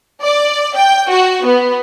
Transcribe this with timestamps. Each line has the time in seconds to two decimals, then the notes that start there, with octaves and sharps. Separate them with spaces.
0.22 D5
0.76 G5
1.10 F#4
1.45 B3